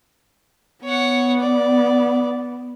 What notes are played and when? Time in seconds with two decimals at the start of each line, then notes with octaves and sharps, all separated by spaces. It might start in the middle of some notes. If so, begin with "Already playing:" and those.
0.84 B3 C#5 F#5
1.40 D5